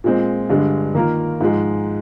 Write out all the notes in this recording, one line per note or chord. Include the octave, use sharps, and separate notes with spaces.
A#2 G#3 C4
G2 D3 G#3
D#3 A#3 F4 A#4
G#2 F3 G#3